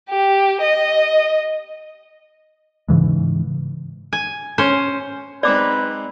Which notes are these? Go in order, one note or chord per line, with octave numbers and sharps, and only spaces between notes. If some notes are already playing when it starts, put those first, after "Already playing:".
G4
D#5
G#2 C#3 E3 G#3
G#5
C#4 C5
G#3 C4 D#4 B4 D5 D6